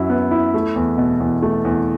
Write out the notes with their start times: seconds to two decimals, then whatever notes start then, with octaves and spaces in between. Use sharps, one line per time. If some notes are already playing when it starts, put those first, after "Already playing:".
Already playing: F#2 F#3 E4
0.10 B3
0.31 E4
0.54 A3
0.76 E2
0.97 B2
1.20 E2
1.42 A3
1.65 E2